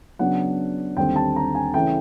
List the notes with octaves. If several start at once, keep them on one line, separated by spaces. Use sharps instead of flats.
C#3 F#3 B3 D4 F#5
D#2 D3 G3 C4 G5
A5
A#5
G#5
C#3 E3 A3 C#4 E4 G5